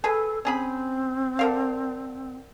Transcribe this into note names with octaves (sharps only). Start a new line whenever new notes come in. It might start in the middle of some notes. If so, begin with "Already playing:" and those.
G#4 A4 B4
C4 C#4 G#4 B5
D3 A#4 F5